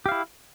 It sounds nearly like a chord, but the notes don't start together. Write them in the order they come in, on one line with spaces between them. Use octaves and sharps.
G4 F5 E4